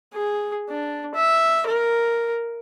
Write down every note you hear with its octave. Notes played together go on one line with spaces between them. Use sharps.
G#4
D4
E5
A#4